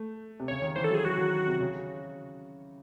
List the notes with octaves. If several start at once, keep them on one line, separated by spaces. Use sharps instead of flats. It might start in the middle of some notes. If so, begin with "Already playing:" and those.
Already playing: A3
C3
C#3 C#5
D#3
E3 C5
A4
F#3 G#4
F#3 F#4
D#3
C3
C#3